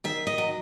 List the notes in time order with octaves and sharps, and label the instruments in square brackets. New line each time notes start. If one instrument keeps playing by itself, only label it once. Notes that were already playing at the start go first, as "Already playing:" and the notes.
[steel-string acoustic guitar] D#3 E5
D#5
F#3